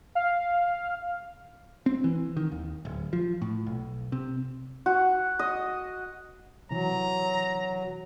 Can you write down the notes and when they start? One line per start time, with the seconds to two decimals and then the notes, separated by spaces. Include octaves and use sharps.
0.15 F5
1.86 C4
2.04 E3
2.37 D#3
2.52 D#2
2.85 D1
3.13 F3
3.42 A2
3.66 B1
4.12 C3
4.86 F#4
5.39 D#5
6.71 C3 E3 F#3 A#5